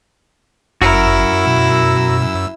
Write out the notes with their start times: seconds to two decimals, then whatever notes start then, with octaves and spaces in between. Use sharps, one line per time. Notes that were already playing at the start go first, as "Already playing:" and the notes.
0.82 G1 F#2 E4 F#4 A#4 E6
1.47 B2